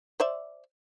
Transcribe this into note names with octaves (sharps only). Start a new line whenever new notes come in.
C5 D5 E5